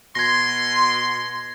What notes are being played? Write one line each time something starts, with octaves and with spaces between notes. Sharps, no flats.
B2 C6 G#6 A#6